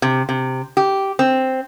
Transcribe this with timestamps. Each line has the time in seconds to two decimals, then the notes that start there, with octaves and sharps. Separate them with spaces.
0.02 C3
0.29 C3
0.77 G4
1.19 C4